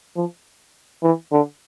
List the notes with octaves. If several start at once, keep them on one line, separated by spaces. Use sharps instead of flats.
F3
E3
D3